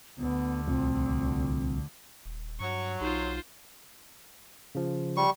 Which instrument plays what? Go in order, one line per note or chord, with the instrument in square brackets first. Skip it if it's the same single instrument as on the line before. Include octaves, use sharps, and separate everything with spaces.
[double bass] D2 D3 [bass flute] B3
[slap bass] C2 A#2 F3 [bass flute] C4
[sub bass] D#1
[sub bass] G2 [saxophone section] F#3 [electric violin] C#6
[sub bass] B1 [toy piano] D#4 G4 [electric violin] F4 C5
[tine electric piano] C#3 F3
[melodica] G3 C#6